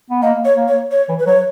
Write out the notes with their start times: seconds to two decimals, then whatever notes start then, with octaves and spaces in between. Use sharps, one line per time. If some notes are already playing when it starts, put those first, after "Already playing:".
0.10 B3
0.22 A#3 D#5
0.45 C#5
0.57 A#3
0.68 C#5
0.91 C#5
1.09 E3
1.19 B4
1.27 F#3 C#5